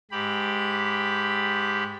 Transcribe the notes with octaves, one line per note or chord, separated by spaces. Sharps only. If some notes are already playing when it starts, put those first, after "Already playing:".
G#2 G4 B5